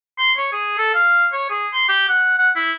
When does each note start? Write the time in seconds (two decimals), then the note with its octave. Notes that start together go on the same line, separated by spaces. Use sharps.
0.18 C6
0.37 C#5
0.53 G#4
0.78 A4
0.94 F5
1.32 C#5
1.50 G#4
1.73 C6
1.88 G4
2.09 F#5
2.38 F#5
2.56 E4